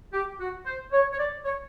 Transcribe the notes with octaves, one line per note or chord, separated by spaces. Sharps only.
G4
F#4
C5
C#5
C#5
D5
C#5